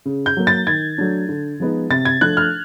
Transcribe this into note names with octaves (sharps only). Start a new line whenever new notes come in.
C#3
G6
F#3 A#3
A6
D#3 G#6
F#3 A3 D4
D3
F3 G#3 B3 D#4
C3 A6
G#6
F3 A3 D4 F#6
F6